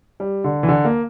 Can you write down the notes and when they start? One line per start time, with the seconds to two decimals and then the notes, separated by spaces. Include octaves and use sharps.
0.20 G3
0.44 D3
0.63 E3
0.69 D3
0.85 A#3